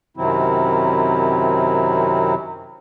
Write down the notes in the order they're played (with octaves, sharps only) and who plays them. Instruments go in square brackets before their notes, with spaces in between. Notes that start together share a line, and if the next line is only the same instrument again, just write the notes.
[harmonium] F#2 C3 D#3 F#3 C4 E4